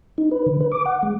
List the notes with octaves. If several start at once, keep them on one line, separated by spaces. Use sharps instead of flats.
D#4
B4
D3
B4
D6
F#5
G#3